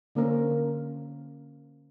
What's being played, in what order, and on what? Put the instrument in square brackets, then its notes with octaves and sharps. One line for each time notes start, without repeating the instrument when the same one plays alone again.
[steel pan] D3 A#3 C#4 A#4 C5